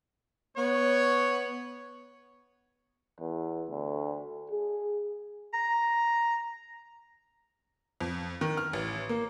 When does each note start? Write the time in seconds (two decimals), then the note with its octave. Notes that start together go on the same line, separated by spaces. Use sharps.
0.56 B3 C#5
3.20 E2
3.70 D2
4.51 G#4
5.54 A#5
8.01 F2
8.41 D#3
8.57 F6
8.73 A1
9.09 A#3